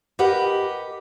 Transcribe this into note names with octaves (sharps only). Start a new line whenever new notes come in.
G4 A#4 B4 D#5 F#5